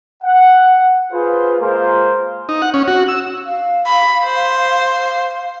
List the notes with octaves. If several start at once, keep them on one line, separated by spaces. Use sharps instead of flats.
F#5
F4 G#4 B4 C5
G#3 A#3 F4 A#4 C5
D#4
F#5
C#4
F#4
E6
F5
B5
C5